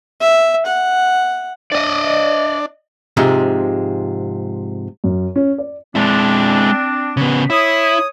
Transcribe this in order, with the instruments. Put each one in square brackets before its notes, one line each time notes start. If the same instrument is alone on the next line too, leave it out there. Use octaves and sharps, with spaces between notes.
[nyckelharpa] E5
F#5
[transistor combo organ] D4 [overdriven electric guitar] D5 D#5
[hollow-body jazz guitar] G#2 C3 F3 G#3
[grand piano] F#2
C#4
D5
[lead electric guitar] G#3 E4 [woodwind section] C4 D4
[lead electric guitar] C#3 B3
[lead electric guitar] E4 [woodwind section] C#5 D#6